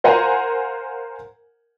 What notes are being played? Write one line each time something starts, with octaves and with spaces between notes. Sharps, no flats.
A#4 C5 F5 F#5 G#5 A#5